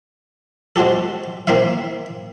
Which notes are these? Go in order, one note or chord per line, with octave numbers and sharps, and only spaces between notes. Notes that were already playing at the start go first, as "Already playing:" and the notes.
G#3 C4 F#4 G4 A4
A#3 C4 E4 E5 F5